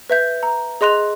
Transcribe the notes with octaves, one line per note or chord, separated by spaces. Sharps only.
B4 E5 G6
A#5
G#4 D#5 C6 F#6 F7